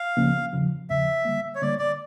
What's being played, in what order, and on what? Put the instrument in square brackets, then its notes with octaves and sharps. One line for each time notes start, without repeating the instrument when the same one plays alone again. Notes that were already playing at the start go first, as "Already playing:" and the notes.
Already playing: [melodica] F5
[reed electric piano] C#2 C#3 F3 A#3 C#4
E2 C#3 F3
[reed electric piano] E2 C#3 F3 [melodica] E5
[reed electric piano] D3 G3 A#3
[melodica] C#5
[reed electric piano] D3 G3 A#3 [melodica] D5
[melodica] D5